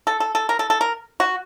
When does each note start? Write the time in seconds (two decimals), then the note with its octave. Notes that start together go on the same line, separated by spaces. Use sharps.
0.07 A4
0.20 A4
0.35 A4
0.49 A#4
0.59 A4
0.70 A4
0.81 A#4
1.20 F#4